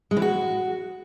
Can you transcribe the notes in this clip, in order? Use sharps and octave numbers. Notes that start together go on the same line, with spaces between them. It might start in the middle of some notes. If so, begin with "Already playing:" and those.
G#3
E3
F#4